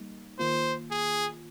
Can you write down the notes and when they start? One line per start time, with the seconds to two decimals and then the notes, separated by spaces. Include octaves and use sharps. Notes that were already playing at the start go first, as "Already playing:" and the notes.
Already playing: G3 A#3 D#4
0.39 D#3 A#3 F4 C5
0.91 G#4